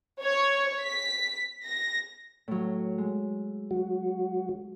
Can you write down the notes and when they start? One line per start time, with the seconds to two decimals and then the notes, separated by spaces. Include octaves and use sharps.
0.22 C#5
0.83 B6
1.66 A#6
2.48 A2 F#3
2.98 G#3
3.71 F#3 F#4